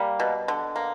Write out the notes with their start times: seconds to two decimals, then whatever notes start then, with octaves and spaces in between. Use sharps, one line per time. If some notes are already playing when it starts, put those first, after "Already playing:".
Already playing: G3 A#3
0.20 B2
0.48 D3
0.76 A#3